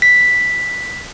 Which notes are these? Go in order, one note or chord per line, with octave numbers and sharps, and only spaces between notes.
B6